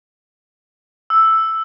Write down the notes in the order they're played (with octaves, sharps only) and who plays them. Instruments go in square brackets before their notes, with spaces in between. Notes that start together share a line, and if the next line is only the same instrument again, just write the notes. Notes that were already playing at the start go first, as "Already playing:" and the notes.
[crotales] E6